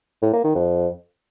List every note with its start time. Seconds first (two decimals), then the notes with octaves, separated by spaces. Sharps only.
0.22 A2
0.33 A#3
0.44 D#3
0.55 F2